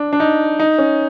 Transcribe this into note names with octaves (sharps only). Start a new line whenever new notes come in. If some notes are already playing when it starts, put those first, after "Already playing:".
Already playing: D4
D4
D#4
D#4
C#4